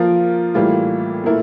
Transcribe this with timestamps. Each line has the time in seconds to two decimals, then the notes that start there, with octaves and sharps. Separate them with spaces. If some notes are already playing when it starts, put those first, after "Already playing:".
Already playing: F3 A#3 F4 A#4
0.54 A2 E3 G3 A#3 F4
1.24 A#2 A3 E4 A#4